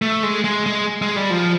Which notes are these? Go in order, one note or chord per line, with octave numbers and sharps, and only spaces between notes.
A3
G#3
G#3
G#3
G#3
G3
F3